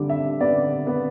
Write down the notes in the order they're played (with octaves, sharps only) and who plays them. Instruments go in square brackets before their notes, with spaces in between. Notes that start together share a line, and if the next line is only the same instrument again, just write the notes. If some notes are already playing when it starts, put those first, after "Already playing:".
Already playing: [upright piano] D3 G3 D6
E5
B3 D5
B3